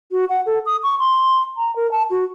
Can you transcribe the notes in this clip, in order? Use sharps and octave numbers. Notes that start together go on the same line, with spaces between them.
F#4
F#5
A4
D#6
C#6
C6
A#5
A#4
A5
F#4